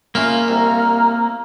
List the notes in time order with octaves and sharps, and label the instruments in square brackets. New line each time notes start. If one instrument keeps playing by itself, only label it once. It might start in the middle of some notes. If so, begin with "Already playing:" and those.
[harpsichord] C#3 F4 E5 [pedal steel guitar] A#3
[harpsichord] C2 [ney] A#5